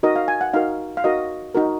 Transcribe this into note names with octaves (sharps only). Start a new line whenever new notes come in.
D#4 F#4 A#4 D#5
F5
G#5
F#5
D#4 F#4 A#4 F5
F5
D#4 F#4 A#4 D#5
D#4 F#4 A#4